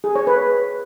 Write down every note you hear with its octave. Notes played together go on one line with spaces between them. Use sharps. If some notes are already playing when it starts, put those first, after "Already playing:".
G#4
C#5
B4